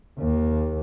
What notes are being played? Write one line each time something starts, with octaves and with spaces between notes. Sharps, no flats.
D#2